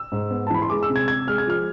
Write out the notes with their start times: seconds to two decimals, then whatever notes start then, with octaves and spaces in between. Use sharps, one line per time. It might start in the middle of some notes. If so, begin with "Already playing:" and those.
Already playing: E6
0.12 G#2
0.31 B3
0.47 A5
0.50 E3 B5
0.62 C6
0.70 G#3 D6
0.83 E6
0.89 C3
0.96 G#6
1.08 C3 G#6
1.27 G#3 F6
1.38 G#6
1.47 F3 F6